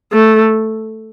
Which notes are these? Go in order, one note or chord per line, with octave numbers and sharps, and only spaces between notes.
A3